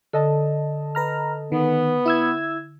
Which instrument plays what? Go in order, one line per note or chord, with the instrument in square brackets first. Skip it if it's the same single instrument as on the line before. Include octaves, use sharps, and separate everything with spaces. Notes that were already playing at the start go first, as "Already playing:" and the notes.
[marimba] D3 [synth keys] A4 D#5 A5
[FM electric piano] B4 A#5 F6
[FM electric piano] D#3 [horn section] B3
[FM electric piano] E4 E6 G#6